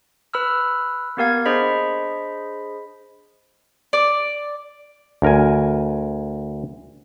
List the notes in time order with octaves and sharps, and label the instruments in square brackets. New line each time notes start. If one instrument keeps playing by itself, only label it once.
[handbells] B4 B5 E6 F6
A#3 B3 G4 A#4 F5 G#6
D4 G#4 C5 D#5 B5 B6
[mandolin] D5
[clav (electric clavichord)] D2 A#4 G#5